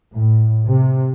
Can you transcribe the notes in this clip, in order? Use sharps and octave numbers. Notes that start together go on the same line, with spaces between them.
A2
C3